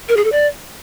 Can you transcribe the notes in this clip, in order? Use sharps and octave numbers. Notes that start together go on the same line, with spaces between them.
A#4
G#4
A4
D5